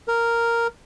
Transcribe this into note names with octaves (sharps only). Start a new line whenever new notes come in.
A#4